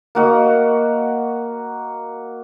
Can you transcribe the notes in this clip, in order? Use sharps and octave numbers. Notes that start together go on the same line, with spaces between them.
A#3 F#4 D#5